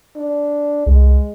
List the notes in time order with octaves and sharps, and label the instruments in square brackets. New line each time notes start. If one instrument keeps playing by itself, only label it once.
[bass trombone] D4
[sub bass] C2 [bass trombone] G#3